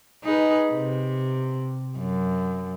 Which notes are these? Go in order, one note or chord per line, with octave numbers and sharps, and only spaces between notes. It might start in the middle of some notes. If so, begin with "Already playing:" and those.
D#4 G#4 B4
C3
F#2